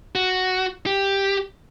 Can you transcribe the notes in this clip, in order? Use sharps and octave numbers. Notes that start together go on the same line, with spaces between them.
F#4
G4